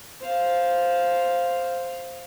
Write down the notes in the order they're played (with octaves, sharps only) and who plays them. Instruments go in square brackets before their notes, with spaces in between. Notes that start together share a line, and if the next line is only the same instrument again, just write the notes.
[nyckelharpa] C5 F5